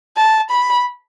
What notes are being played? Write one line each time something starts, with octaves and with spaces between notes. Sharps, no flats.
A5
B5